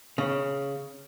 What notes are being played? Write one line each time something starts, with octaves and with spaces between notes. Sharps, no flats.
C#3